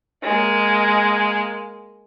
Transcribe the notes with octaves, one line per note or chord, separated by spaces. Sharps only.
G#3 A#3